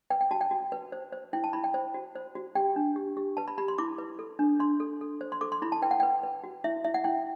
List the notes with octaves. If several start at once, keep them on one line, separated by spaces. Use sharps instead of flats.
B4 G5
G5
F#4 A5
G5
F#4
B4
C5
C5
E4 G5
A5
E4 B5
G5
C5
F#4
C5
F#4
G4 G5
D4
G4
G4
B4 A5
B5
G4 B5
C6
E4 D6
B4
A4
D4
D4 C6
A4
A4
C5
C6
A4 D6
C6
E4 B5
A5
B4 G5
F#5
B4 G5
B4
F#4
E4 E5
E4 E5
F#5
E4 G5